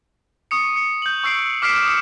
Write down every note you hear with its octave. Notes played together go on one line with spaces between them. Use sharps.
C#6 D#6 C#7
C#7
G6 F#7
C#6 E6 C7 D7
D6 F6 B6 C7 D7 E7
D#6 C#7